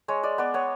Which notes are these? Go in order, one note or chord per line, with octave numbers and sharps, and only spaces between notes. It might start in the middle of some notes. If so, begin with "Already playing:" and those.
G#3 C#5
G#3 D5
B3 D5
B3 C#5